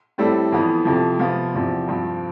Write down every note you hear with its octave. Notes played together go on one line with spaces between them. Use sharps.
A2 G3 C4 E4 A4
F2 E3 B3
F2 C3 F3
C3 F3 B3 F4
E2 C3 F3 C4
G2 F3 C4